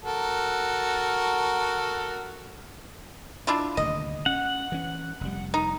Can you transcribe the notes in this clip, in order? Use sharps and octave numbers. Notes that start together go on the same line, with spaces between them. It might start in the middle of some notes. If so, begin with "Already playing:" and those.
F#4 A4 A#4
D4 E4 F4
D#1 D2 C3 D#5
C#4 F#5
E3 C#4
F1 G3
D#4